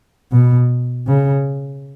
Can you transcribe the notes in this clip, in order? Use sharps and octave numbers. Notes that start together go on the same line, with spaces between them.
B2
C#3